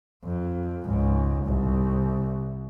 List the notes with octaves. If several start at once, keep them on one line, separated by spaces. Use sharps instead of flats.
F2
C#2 G#2
C2